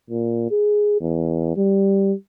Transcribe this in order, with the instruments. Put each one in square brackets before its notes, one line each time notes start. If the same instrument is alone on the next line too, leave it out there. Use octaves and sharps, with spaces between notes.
[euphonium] A#2
G#4
E2
G3